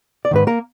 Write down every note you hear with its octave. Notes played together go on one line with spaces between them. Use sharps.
D5
G#2 D#3 B4
A#3 A#4